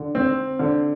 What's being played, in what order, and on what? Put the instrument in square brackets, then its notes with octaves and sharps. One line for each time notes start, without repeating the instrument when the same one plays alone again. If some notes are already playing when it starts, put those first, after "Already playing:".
Already playing: [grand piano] D3
C4
D3